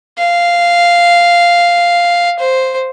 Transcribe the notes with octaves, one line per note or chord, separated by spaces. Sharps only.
F5
C5